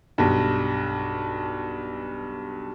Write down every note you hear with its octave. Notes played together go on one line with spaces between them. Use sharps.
B1 G2